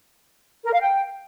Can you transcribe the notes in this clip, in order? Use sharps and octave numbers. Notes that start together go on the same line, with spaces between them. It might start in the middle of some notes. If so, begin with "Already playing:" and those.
A#4
F5
G5